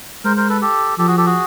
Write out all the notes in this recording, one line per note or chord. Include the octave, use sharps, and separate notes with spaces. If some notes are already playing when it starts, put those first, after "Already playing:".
G#3 A#4 C5
A#4 C5
A4 B4
G4 A4
F3 G4 A4
F#4 G#4
G4 A4
F#4 G#4